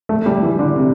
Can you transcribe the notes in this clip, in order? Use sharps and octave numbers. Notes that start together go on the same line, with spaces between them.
A3
G3
E3
D3
C3